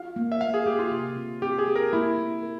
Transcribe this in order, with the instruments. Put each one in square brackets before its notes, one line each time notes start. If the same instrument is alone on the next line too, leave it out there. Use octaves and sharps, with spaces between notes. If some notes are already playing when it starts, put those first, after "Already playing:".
Already playing: [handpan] F4 [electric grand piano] F5
[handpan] A#3
[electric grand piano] E5
[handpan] A#3 [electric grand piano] F5
[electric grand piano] G#4
[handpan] A#3 [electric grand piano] G4
[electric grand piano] F4
[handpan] C3
C4
[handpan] C4 [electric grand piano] G4
[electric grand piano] G#4
[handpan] C4
[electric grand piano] A#4
[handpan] A#3 [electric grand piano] E4
[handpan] A#3
A#4